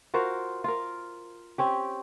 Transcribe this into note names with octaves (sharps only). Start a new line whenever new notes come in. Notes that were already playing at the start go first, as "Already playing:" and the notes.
F4 F#4 A#4 C5
F4 A#4
C4 C#4 G4